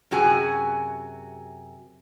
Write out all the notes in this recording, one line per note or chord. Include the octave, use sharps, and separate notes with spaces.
F#2 C3 F#4 G#4 G#5